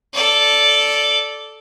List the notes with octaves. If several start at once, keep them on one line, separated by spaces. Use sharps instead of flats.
A4 D5